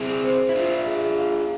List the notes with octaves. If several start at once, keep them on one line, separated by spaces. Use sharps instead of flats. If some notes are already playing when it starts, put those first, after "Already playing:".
Already playing: C4 E4 G#4
C5
E4
D4 F4 E5
G#4
F5